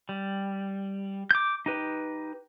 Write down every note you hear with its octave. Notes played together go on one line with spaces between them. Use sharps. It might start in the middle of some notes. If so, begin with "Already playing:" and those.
G3
D6 G6
D#4 G4 B4